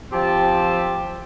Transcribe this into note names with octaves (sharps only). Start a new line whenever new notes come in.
F3 C4 G4 A5